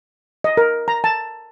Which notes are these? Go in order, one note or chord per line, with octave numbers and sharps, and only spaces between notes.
D#5
A#4
A#5
A5